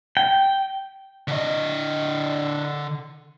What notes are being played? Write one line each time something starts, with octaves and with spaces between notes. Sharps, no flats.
G5
D3 D#5